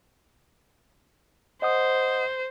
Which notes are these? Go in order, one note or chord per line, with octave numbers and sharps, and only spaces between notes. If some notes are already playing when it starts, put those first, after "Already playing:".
C5 D#5 F#5 D#6